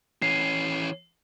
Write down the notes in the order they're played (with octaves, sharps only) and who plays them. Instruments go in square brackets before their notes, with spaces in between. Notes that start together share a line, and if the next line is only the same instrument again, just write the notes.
[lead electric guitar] E3 C#4 [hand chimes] C7